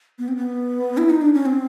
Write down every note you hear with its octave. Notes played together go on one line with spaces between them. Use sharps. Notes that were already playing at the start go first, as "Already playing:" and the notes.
B3
C4
B3
E4
D#4
D4
C#4
C4